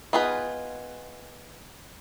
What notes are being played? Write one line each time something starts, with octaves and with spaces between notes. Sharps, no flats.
B3 D#4 F4 G#4 B4